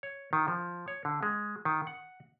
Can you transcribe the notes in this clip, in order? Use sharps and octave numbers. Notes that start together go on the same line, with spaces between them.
C#5
D#3
F3
C#5
D3
G#3
D#3
F#5